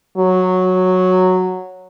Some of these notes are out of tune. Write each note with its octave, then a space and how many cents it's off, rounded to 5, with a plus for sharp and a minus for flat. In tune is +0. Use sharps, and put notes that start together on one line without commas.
F#3 -5